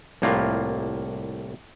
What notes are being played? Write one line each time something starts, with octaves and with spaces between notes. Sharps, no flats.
C2 A2 A#3 F4